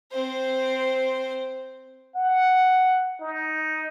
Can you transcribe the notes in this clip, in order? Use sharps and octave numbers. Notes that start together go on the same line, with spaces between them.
C4 C5
F#5
D#4